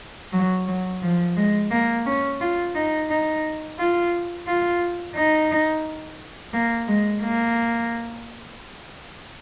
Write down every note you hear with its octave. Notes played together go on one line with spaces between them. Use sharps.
F#3
F#3
F3
G#3
A#3
C#4
F4
D#4
D#4
F4
F4
D#4
A#3
G#3
A#3